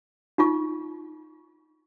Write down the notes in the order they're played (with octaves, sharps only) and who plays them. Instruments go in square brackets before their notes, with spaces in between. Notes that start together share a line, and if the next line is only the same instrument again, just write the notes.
[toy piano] D#4 F4 C#6